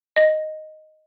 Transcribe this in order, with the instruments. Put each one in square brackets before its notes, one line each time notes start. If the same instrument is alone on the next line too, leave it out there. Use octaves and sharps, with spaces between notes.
[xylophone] D#5 A#6